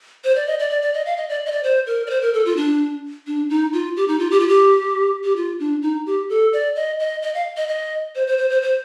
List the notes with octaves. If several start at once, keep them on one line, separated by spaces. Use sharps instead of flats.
C5
D5
D#5
D5
D5
D5
D#5
F5
D#5
D5
D#5
D5
C5
A#4
D5
C5
A#4
A4
F4
D4
D4
D#4
F4
G4
D#4
F4
G4
F4
G4
G4
F4
D4
D#4
G4
A4
D5
D#5
D#5
D#5
F5
D#5
D#5
C5
C5
C5
C5
C5